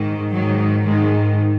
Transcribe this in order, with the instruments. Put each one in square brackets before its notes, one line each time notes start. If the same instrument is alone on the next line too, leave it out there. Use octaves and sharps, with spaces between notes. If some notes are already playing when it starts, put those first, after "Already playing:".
Already playing: [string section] G#2 D#3
G#2 D#3 F#3
G#2 D#3 G#3